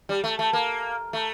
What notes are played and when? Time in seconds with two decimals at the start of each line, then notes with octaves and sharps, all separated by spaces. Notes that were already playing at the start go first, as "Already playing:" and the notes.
0.09 G3
0.24 A3
0.39 A3
0.53 A#3
1.13 A3